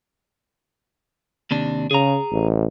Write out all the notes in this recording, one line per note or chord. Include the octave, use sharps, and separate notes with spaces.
D#2 C3 D4
C#3 G#4 A#5
A1